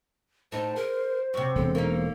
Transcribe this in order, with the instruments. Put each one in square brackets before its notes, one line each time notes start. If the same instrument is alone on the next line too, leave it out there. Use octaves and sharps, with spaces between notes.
[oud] A2 D#4 [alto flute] C5 [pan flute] A5
[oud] G#4 [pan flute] A#4
[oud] F#2 C3 [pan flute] C#6
[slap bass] E1 [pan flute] A4
[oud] A#3 C#4 D#4